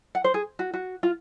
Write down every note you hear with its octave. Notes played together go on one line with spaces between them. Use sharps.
F#5
C5
G#4
F#4
F#4
F4